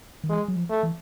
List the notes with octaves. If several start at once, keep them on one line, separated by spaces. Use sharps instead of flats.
D#3
E3 G#3
F#3
F3
A3
E3